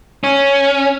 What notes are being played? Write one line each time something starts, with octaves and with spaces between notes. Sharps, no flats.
C#4